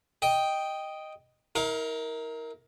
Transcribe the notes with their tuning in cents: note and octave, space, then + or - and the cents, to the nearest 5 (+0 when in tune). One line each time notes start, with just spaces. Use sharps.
D#5 +0 G5 +0
E4 -45 A#4 +0 F5 +20